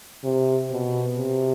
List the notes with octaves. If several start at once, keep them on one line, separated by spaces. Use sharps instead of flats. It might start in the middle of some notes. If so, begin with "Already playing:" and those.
C3
B2
C3